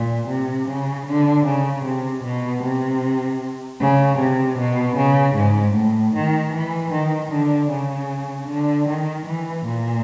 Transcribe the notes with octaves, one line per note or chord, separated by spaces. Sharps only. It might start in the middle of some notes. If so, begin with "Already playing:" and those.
Already playing: A#2
C3
C#3
D3
C#3
C3
B2
C3
C#3
C3
B2
C#3
G#2
A2
D#3
E3
D#3
D3
C#3
D3
D#3
E3
A#2